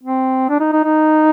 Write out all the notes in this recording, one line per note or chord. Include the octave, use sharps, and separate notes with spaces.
C4
D4
D#4
D#4
D#4